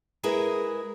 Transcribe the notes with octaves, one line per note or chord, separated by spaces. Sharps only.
G#3 E4 G#4 A#4 B4 E5